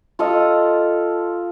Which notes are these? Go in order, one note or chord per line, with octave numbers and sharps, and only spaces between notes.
F4 A4 D#5 F5